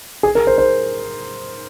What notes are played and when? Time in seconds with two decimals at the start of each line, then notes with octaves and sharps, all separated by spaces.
0.23 G#4
0.35 A#4
0.47 C5
0.58 C5